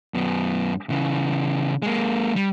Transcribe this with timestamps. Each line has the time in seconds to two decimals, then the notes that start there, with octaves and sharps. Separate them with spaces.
0.14 F#2 B3
0.90 C#3 E3
1.82 G#3 A#3
2.36 G3